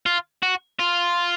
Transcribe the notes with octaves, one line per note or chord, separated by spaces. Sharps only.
F4
F#4
F4